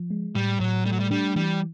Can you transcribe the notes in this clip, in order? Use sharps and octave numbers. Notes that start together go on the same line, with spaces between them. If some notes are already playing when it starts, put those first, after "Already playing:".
Already playing: F3
G#3
A2 G3
A2 F#3
G3 A3
F#3
G3
G3 D4
E3 G3